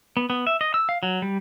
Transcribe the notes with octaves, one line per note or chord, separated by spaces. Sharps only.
B3
B3
E5
D#5
E6
F5
F#3
G3